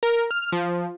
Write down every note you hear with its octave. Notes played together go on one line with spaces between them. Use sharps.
A#4
F6
F3